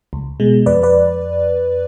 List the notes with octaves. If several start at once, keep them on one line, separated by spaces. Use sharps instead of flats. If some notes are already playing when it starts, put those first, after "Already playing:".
C#2
B2 G#3
F2 B4 D5
B4 D5